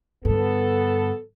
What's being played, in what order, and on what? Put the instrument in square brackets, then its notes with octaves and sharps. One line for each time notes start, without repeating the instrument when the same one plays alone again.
[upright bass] G2 D3 [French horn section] B3 A4